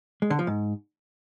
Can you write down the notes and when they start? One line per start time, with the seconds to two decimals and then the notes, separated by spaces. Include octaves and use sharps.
0.22 G#3
0.30 D3
0.39 F3
0.47 G#2